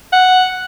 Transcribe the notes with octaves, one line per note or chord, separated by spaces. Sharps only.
F#5